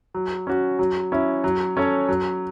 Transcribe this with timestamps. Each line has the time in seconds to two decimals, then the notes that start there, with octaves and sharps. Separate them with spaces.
0.14 F#3
0.47 C#4 F#4
0.79 F#3
1.12 C#4 E4
1.44 F#3
1.77 C#4 A4 C#5
2.09 F#3